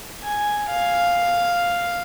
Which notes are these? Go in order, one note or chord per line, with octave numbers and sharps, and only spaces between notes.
G#5
F5